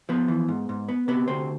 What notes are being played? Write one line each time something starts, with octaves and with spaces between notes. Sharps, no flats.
F3 B3
E3
G#2
G#2
B3
C3 B3
D2 C4